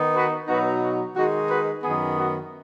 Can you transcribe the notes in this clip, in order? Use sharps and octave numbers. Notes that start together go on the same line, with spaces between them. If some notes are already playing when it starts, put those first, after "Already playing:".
Already playing: D#3 B3 D#4
F#4 B4
B2 F#3 B3 D#4 F#4 B4
F#4
D#3 G#3 D#4 F#4
F#4 B4
F#2 D#3 B3 G#4
F#4